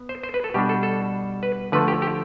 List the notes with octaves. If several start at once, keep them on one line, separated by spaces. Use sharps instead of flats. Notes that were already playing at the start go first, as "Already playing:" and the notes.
Already playing: B3
C5
C5
B4
A4
B2 G3 D4 G4
A4
A4
B4
D3 F3 A3 B4
G4
G4